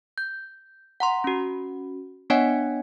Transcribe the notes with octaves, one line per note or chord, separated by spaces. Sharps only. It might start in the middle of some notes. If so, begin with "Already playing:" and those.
G6
F#5 A#5 C6
C#4 F#4
B3 D4 C#5 D#5 F#5 G#5